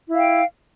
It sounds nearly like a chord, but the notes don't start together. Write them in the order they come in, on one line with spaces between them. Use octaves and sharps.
E4 F5 G5